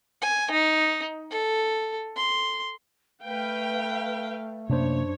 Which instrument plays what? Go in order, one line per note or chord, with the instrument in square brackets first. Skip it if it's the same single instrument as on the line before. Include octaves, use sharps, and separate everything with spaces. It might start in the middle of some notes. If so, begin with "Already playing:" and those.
[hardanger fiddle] G#5
D#4
A4
C6
[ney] A3 [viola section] B4 F5 G5
[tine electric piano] F#2 D4 C5 [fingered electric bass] C3 A#3 [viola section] C#5